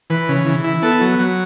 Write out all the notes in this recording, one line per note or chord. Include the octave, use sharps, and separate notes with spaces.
E3 B4
C#3
E3
E4
B3 A4
F#3
F#3